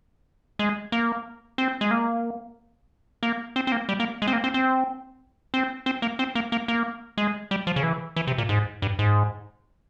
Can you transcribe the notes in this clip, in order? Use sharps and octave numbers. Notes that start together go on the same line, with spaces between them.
G#3
A#3
C4
G#3
A#3
A#3
C4
C4
A#3
G3
A#3
G#3
C4
A#3
C4
C4
C4
C4
A#3
C4
A#3
A#3
A#3
G#3
G3
F3
C#3
E3
E3
C3
A#2
G#2
G2
G#2